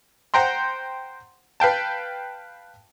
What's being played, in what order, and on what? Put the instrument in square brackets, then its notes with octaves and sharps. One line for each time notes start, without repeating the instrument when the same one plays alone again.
[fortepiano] C5 F#5 G5 A#5 C6
B4 F5 G5 A5